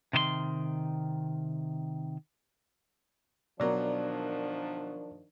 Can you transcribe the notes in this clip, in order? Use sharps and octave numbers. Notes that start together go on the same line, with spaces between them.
C3 D#3 C5 C6
B2 D#3 F3 F#3 D4 A#4 D5